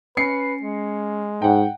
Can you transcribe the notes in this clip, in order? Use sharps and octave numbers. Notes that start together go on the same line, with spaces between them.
C#4 B4 C7 C#7
G#3
G#2 F#5 G5